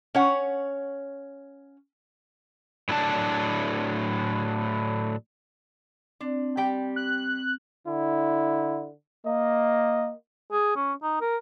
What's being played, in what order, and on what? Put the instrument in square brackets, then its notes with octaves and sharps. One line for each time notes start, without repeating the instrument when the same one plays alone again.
[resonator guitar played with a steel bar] C#4 C#5 F#5
[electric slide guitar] A2 F#3 D4 A5
[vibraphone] C4 [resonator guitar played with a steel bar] D4
[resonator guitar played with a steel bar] G3 G4 G5
[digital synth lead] F#6
[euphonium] D3 [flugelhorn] E4
[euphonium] A#3 [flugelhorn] D#5
[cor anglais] G#4
C#4
D#4
A#4